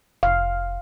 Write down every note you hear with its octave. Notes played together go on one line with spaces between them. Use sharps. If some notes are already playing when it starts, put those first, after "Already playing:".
F1 F5